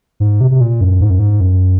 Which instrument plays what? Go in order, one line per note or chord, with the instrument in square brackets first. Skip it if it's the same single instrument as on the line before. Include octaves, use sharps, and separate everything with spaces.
[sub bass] G#2
C3
C3
A#2
F#2
G#2
F#2
G#2
F#2